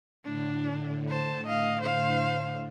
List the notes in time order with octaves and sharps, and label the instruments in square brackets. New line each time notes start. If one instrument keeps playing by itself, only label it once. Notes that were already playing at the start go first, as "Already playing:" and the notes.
[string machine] A2 D3 [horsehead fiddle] D4
[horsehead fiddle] C5 A5
D#5 F5
C5 F5